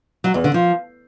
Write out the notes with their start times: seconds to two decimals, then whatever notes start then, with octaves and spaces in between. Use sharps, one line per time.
0.24 F#3
0.34 E2
0.44 D3
0.54 F3